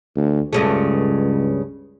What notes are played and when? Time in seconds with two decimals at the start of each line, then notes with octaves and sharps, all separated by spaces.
0.16 D2
0.53 C#2 G2 C#3 A3